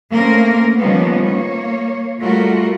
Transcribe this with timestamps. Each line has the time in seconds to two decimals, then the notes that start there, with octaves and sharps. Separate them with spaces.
0.13 A3 A#3 C4 C#4 A#4
0.77 D#3 F3 G3 A#3 B3 C#4
1.26 A#3 C#5
2.20 G3 A3 F4 F#4 A#4